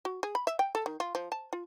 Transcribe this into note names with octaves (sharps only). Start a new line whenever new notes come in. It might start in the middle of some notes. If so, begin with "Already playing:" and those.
F#4
G#4
B5
E5
G5
A4
D#3
F4
F3
A5
F4